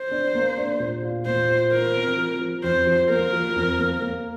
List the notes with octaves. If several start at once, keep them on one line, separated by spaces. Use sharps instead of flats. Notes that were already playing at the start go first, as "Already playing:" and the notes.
Already playing: C5
D4
A#3
D4
A#2
F4
A#2 C5
F4
F4 A#4
C4
F3
F3
F2 C5
F3
A#3 A#4
F3
F2
A#3
A#3